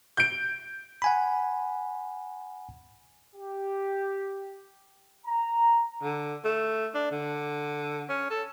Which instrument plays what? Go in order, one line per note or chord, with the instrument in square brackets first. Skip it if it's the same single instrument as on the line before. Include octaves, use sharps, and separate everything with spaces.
[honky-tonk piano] G6 D7
[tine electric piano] F#5 G#5 B5
[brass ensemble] G4
A#5
[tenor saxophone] D3
A3
D4
D3
C#4
A4